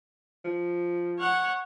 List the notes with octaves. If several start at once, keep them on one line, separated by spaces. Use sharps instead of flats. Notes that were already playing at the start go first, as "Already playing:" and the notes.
F3
C#5 F#5